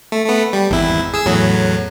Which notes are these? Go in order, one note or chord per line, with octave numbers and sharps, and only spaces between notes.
A3
A3 B3
G3
G#1 E2 E4
G#4 E6
E2 A2 F#3